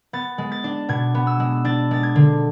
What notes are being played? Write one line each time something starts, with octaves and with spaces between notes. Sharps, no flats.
B3 A6
G#3
A6
D4
B2 G#6
B3
E6
G#3
D4 A6
G#3 A6
G#6
D3